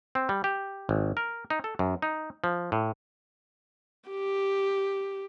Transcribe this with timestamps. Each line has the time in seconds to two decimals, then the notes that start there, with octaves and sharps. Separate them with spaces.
0.15 C4
0.29 G3
0.44 G4
0.89 G#1
1.17 A#4
1.50 D#4
1.64 A4
1.79 F#2
2.02 D#4
2.44 F3
2.72 A2
4.09 G4